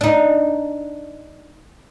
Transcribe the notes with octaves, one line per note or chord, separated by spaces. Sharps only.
D4 D#4